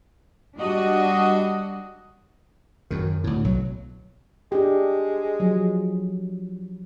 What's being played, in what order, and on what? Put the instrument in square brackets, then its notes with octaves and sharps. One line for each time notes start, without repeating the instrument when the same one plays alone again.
[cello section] G3 D4 F#4 D#5
[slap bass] F#2 D#3
D2 A2
B1 F#3
[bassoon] G#3 [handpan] D4 G4
[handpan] F3 F#3